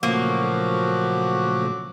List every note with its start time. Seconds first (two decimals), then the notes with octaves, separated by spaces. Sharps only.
0.03 A#2 C#3 F3 F#3 A3 A#3 F#4 D6